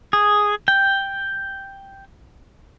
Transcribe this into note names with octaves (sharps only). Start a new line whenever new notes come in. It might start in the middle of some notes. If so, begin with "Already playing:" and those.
G#4
G5